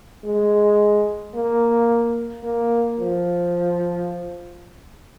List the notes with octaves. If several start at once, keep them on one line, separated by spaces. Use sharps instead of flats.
G#3
A#3
A#3
F3